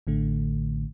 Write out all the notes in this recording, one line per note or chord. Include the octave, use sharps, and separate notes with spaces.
A1 A2 D3 A3